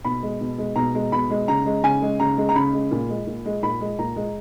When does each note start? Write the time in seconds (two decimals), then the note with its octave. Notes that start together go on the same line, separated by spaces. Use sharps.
0.05 B2 B5
0.23 G#3
0.41 B2
0.58 G#3
0.76 B2 A#5
0.95 G#3
1.12 B2 B5
1.30 G#3
1.48 C#3 A#5
1.66 G#3
1.83 C#3 G#5
2.02 G#3
2.20 C#3 A#5
2.38 G#3
2.49 A#5
2.55 C#3 B5
2.73 G#3
2.91 A#2
3.09 G#3
3.27 A#2
3.46 G#3
3.63 A#2 B5
3.81 G#3
3.99 A#2 A#5
4.16 G#3